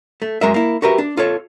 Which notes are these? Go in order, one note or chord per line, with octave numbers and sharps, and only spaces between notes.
A3
F#2 G#3 A#4 E5
A#3 E4
F#4 G4 A#4 B4 E5
D4
F4 A4 C#5